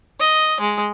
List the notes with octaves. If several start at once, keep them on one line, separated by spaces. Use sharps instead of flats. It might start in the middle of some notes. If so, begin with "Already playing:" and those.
D#5
G#3